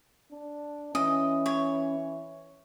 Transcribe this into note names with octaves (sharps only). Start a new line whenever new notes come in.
D4
E3 C#4 D#5
C#5